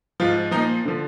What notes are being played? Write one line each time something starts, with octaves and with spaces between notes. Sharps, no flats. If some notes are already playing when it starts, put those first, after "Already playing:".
G#2 F3 F4
A#2 F3 D#4
D3 F3